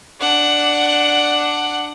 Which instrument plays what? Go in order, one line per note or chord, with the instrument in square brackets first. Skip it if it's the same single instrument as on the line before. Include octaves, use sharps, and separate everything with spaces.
[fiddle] D4 F#5